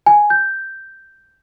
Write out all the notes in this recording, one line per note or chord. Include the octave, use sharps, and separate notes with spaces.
G#5
G6